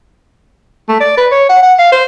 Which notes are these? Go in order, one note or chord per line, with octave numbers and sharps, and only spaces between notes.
A3
D5
B4
C#5
F#5
F#5
F5
C5